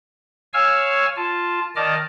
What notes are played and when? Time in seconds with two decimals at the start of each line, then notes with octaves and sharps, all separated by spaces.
0.54 C#5 F5 G#5 C#6 E6 F6
1.16 F4 A5
1.76 D#3 D5 D#5 A5 D6 F6